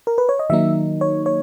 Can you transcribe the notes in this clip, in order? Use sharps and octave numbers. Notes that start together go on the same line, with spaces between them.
A#4
B4
C#5
D#5
D#3 F#3 A#3 D#4 E5
C#5
C#5